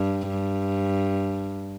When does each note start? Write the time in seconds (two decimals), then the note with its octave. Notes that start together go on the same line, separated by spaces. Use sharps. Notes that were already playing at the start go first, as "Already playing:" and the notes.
Already playing: G2
0.30 G2